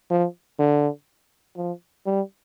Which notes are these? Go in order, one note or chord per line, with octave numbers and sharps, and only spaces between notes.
F3
D3
F3
G3